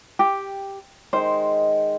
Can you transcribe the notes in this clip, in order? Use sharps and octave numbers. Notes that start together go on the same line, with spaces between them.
G4
D#3 G#3 C5